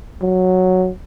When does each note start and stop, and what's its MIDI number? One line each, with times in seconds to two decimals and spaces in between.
0.22 0.90 54